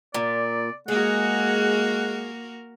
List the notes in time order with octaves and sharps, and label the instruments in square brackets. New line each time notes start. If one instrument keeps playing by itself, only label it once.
[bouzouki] A#2 [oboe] D5
[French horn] G#3 [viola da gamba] A#3 F#4 A#4 [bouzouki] G#4 [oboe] F#5